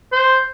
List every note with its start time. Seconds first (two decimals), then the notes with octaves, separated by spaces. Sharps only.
0.13 C5